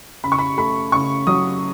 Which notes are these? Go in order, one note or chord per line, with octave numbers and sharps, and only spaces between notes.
C#3 B5
C#6
B5
A3 B5
C#3 C#6
F#3 D#6